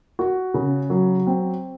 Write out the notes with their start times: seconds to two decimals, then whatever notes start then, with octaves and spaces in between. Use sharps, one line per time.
0.19 F#4
0.54 C#3
0.90 F#3
1.27 C4